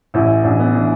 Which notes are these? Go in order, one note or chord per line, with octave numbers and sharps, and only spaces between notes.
A1 A2 E3 E4
A1 A2 E3 D4
B3
A2 E3 D4